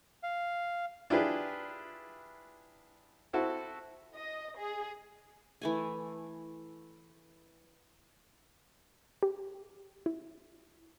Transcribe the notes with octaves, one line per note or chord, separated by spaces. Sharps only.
F5
D4 E4 F4 G4 G#4 B4
C4 E4 F#4 A4
D#5
G#4
E3 A3 G#5
G4
E4